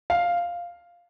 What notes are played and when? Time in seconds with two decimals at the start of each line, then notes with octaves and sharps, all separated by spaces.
0.10 F5